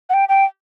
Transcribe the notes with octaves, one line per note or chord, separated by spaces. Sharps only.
F#5
G5
G5